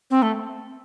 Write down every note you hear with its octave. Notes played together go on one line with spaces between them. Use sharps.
C4
A3